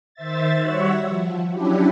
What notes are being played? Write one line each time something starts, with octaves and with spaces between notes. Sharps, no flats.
D#3 C5 E5 A6
G3 F#4 C#5 E5 F#5
F3
F#3 C#4 D4 E4 G4